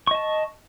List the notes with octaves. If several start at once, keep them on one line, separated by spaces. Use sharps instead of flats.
D#5 A5 C#6